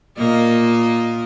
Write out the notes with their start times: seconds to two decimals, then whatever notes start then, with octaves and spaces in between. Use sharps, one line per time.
0.18 A#2 A#3 D#5